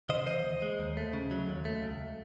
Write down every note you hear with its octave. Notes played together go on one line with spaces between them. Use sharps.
C#3 C5 D#5
E3 C5 D#5
D#2
G#3
D#2
A3
C#3
F#3
D#2
A3
C#2